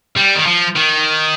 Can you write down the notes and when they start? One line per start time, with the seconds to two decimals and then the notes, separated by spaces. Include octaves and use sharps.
0.16 G3
0.35 D#3
0.46 F3
0.75 D#3